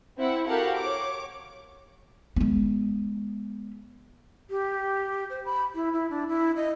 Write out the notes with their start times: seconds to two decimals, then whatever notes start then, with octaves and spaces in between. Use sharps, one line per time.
0.17 C4 E4 F#5
0.48 F#4 G4 A4 A#4 F5 F#5
0.79 C#5 D6
2.36 G#3 B3
4.50 G4
5.30 C5
5.45 B5
5.75 E4
5.93 E4
6.10 D4
6.28 E4
6.56 D#5